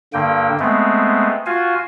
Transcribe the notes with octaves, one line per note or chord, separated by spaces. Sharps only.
G2 D3 A#3 G5
G#3 A3 B3 C4
F4 F#4 F5 G#5